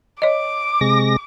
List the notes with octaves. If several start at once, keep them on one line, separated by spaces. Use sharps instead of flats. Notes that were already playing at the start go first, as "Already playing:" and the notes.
C#5 D#5 D6
C3 G#3 A#6